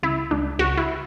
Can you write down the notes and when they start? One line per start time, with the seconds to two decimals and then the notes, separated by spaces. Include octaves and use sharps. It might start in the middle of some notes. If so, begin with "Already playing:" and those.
0.03 C#2 E4
0.31 C#2 D4
0.59 C#2 F#4
0.77 E4